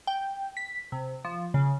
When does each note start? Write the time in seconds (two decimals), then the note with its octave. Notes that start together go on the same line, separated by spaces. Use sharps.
0.07 G5
0.57 B6
0.92 C3
1.25 F3
1.54 C#3